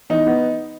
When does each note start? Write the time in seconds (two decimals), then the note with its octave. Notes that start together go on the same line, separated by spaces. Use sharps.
0.10 E2 D#4
0.27 B3